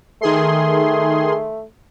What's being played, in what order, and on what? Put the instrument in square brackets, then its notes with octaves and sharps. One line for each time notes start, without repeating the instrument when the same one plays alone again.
[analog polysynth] D#3 G#4 C6 [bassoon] A3